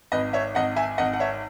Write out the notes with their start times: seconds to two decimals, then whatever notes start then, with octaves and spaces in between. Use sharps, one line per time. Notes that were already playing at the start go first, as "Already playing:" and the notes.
0.12 G#1 B4 D#5
0.33 C#5 E5
0.55 G#1 D#5 F#5
0.76 E5 G#5
0.98 G#1 D#5 F#5
1.13 F#5
1.20 C#5 E5